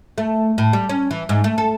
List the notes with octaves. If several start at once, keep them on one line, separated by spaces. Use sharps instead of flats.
A3
A2
G3
C#4
E3
G#2
A3
A4